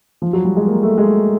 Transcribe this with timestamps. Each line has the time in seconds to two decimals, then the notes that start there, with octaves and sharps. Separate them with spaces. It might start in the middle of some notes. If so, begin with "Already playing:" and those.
0.22 F3
0.33 F#3
0.45 G3
0.56 G#3
0.67 A#3
0.83 A3
0.98 G#3